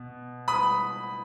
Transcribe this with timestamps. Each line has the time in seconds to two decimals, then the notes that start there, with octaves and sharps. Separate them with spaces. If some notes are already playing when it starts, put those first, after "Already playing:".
Already playing: B2
0.48 B5 D#6